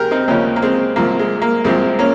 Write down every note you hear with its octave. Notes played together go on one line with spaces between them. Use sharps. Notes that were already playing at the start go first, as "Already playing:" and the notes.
Already playing: D#2 C#3 G4 G#4 A#4 C5
C4 D#4
D#2 C#3 F3 A#3 C#4
A#3
G#3 C4
C2 C3 F3 A#3
G#3
A#3
C2 C3 F3 G#3 C4
A#3 C#4